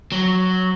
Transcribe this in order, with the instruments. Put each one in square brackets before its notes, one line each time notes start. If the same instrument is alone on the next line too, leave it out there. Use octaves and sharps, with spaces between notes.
[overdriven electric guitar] F#3